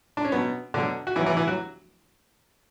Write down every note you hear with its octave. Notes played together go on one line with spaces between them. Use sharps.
D4
C#4
B2 F#3 B3
B2 D3 F#3 D4
F#4
B2 E3 F#3 E4
E3 E4
E3 E4
F#3 F#4